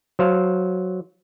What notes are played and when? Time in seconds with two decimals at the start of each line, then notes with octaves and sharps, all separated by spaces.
0.19 F#3 C5 F5